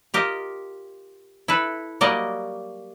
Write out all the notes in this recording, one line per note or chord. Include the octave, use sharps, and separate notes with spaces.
F4 G4 A#4 D#5
E4 A4 B4
F#3 G3 A#3 A#4 D5 D#5